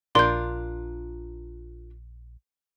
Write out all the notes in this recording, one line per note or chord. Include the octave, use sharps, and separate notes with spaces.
A#1 D4 F4 A#4 C6 G6